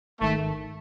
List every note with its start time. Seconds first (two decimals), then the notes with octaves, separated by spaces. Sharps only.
0.21 G#1 G#2 D#3 A3